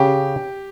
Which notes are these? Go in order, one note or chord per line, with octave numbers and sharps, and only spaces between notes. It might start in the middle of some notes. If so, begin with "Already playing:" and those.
Already playing: C#3 G4